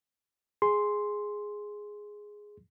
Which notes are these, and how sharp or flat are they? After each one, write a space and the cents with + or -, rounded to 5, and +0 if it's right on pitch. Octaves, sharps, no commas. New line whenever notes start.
G#4 +0 C6 +0